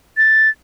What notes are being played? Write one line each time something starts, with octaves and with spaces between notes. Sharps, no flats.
A6